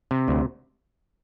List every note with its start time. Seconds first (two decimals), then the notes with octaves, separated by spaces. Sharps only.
0.11 C3
0.28 D2